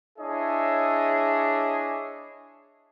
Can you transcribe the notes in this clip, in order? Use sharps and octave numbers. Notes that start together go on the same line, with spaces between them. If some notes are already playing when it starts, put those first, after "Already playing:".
D4 E4 G#4 C#5 D#5 E5